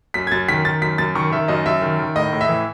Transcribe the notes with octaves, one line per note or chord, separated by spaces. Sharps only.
F#2 B6
G#6
F#2 A6
D#3 B6
D#3 A6
F#2 B6
F#2 A6
D#3 C#6
D#3 E5
F#2 D#5
F#2 E5
D#3
D#3
A2 D#5
A2
E5
E3